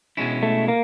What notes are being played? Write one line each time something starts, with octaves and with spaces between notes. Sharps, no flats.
B2 G#3 C#4 E4
A3
A#3